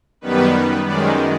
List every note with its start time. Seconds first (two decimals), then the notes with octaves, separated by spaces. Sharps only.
0.21 F#2 D#3 G3 B3 B4
0.86 F#2 D#3 G#3 D5